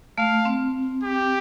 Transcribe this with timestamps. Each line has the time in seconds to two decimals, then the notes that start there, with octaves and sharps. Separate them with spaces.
0.18 A3 F5
0.45 C4
1.03 G4